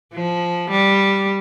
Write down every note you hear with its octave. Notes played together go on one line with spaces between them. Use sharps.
F3
G3